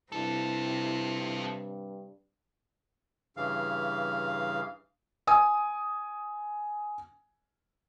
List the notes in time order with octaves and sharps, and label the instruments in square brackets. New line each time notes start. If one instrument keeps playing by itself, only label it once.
[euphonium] G2 [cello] C3 [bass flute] E4 [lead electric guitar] F4 A4
[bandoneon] G2 C#3 E3 F5
[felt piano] G#5 D#6